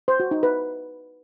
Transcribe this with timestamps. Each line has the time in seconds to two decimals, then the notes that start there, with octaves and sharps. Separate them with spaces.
0.08 C5
0.20 F#4
0.31 D#4
0.43 B4